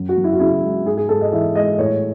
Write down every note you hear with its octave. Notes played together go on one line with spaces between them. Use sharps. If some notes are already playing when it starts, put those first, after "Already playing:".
Already playing: F#2 F#3
F#4
F#2
E4
F#4
C#3 E4
G#3
G#2 G#4
G#4
G#2 A4
D#5
E3 E5
G#3 D#5
A2 C#5